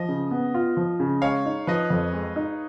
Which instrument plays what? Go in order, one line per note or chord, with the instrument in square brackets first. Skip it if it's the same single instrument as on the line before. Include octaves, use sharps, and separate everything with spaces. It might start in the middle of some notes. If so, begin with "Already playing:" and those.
Already playing: [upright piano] F3 [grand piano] D#5
[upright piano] C#3
B3
F4
F3
C#3
[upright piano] G#3 [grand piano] C#5 F5
[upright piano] D#4
[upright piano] F3 [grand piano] B4 D#5
[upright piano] F2
G#3
D#4